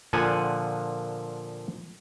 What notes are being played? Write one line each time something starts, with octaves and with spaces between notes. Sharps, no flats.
A#2 D3 F3 F#5 G#5